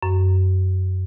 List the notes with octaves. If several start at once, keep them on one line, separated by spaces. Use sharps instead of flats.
F#2